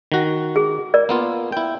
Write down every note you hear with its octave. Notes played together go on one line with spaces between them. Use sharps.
D#3 F#4
G#4
A#4 D5
A#3 B3 F4
E4 G5